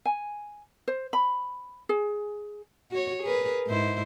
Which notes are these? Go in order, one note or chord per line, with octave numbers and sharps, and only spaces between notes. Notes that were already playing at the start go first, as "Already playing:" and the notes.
G#5
C5
B5
G#4
F#4 C#5
G#4 A#4 B4
G#2 E4 C5